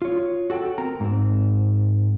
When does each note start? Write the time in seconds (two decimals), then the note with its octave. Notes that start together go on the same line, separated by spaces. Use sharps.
0.02 F4 C#5
0.50 F#4 A4 F#5 G5
0.78 C4 A#4 A#5
1.00 G#2 C4